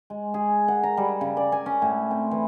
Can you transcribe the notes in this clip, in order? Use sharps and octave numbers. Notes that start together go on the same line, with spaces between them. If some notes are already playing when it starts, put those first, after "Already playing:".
G#3
G#4
F#5
A#5
G3
C#3
D5
G#5
C#4
A2
C4
E3